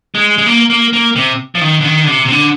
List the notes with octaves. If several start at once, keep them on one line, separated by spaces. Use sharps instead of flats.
G#3
G#3
A#3
A#3
A#3
C3
F3
D#3
D3
D#3
D3
C3
C3
D3